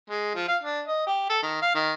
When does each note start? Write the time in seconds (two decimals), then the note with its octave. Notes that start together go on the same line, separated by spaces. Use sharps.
0.10 G#3
0.35 F3
0.48 F5
0.63 D4
0.88 D#5
1.07 G4
1.29 A4
1.43 D#3
1.62 F5
1.75 D#3